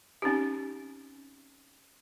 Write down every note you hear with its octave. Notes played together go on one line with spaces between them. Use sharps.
C4 C#4 D#4 G4